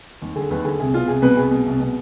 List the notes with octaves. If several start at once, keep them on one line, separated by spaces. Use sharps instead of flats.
D#2
D3 G#4
D#2 B4
D3 G#4
C2 G#4
B2 F4
C2 G#4
B2 B4
C2 G#4
B2
C2
B2